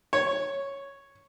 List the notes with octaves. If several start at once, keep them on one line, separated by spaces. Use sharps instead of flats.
C#5